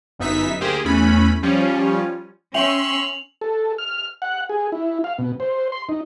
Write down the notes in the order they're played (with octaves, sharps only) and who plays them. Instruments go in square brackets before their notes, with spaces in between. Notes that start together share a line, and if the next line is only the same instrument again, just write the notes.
[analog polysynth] G1 F#2 B3 D#4 E5 B6
D2 A#3 G4 G#4 C5
E2 E3 A3 C#4 B5
F3 G3 C#4 F4
[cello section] C#4 [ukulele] E5 G5 [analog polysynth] C6 C#6 E6 [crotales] F7 F#7
[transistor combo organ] A4
F6
F#5
G#4
E4
F5
B2
C5
C6
D#4